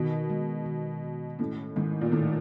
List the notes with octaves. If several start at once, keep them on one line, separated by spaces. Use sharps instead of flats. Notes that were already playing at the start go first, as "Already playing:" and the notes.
Already playing: B2 D#3
G#3
D#3
D#3
A2 C#4
G#2 D#3
A#2
A2 D#3